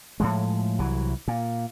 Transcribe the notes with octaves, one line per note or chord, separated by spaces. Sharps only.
A2 F3 G#3
C2 E3 F#3
A#2